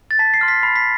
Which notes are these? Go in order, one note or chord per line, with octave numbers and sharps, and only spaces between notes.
A6
A5 B6
C7
C6 F6
B6
B5 C7
B6